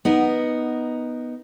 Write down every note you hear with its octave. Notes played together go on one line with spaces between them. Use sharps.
B3 D#4 A#4